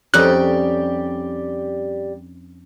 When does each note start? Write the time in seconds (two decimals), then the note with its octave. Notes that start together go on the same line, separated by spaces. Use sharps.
0.14 F2 G3 C#4 D#4 G4 D5 F#6